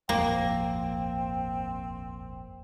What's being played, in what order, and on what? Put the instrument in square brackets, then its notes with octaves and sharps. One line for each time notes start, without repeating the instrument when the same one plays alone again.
[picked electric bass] D#1 G#1 F2 [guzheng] A#3 [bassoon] C4